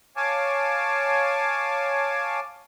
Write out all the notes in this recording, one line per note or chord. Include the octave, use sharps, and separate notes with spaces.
C#5 F5 G#5 A5 D6